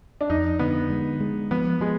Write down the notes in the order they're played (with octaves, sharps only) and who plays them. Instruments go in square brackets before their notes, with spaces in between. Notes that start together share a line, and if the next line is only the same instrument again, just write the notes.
[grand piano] D4
[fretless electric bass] F2 [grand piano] D#4
[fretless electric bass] D3 [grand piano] B3
[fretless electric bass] G#3
G#3
[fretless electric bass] F3 [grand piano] B3
[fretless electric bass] F3 [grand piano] G#3